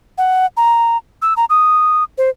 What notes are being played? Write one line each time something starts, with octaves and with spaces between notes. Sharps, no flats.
F#5
A#5
E6
A#5
D#6
C5